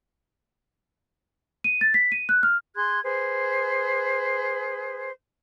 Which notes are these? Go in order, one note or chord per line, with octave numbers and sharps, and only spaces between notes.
D#7
A6
B6
D#7
F#6
F6
G#4 C6 F#6 G#6
G#4 B4 C5